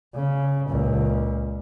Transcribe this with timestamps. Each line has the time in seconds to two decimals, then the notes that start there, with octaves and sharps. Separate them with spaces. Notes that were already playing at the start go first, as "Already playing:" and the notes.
0.15 C#3
0.69 C#2 A#2